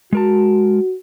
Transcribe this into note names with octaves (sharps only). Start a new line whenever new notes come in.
G#3 F#4 A#4 A5